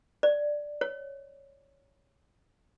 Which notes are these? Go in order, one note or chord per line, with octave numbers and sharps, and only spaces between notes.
D5
C#5